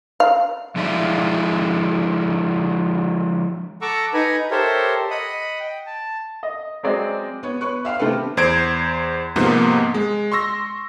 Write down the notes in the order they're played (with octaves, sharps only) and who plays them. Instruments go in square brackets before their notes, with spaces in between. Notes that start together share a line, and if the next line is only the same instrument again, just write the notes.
[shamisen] F5
[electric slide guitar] F3 G#3 D4 E4 E5 F5
[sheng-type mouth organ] A4 F#5 A#5 C#6 D6 E6
D#4 B4 F#5 G#5 A#5
G4 A4 A#4 C5 C#5 E5
D#5 F#5 B5 D#6
G5
A5
[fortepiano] D#5
F#3 G#3 C4 D5 D#5
[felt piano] B3 C#5
B4 C#5 C#6 F#6
E5 F5 G5 F6
C3 A3 C4 A4 B4
[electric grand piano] E2 C5 G#6 D7
G#2 C3 F3 A#3 B3
G#3
C6 C#6 E6 A#6